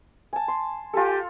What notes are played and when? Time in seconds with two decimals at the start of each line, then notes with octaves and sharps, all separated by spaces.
0.33 G#5 A5
0.48 C6
0.93 F4 G4 A4 G#5